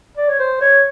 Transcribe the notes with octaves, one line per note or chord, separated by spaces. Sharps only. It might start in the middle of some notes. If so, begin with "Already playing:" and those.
D5
C#5
C5
C#5